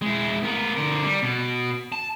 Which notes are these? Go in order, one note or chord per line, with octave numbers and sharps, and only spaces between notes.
G#3 E4
B3 A#4
D3 A#4
G3
B2
A5